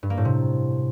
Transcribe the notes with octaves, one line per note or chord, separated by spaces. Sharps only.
G2
A#3
A2
C3